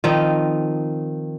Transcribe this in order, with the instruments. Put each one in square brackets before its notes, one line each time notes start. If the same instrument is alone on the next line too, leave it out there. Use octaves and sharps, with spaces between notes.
[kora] D#3 F3 C4 D#4